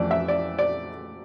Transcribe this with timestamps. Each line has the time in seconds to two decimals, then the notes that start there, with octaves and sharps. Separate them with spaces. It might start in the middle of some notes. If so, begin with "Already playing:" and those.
Already playing: F2 E3 A3 D5
0.11 E5
0.28 D5
0.59 D5